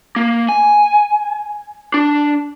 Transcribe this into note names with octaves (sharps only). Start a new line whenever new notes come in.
A#3
G#5
D4